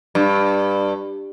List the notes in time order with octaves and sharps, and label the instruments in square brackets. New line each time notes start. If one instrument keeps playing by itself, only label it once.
[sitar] G2